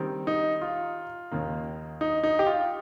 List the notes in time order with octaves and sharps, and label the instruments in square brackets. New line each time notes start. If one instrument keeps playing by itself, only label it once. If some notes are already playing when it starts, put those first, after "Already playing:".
Already playing: [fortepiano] D#3 G3 C4
[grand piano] D#4
F4
[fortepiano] D#2 D#3 A#3
[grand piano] D#4
D#4
G4
F4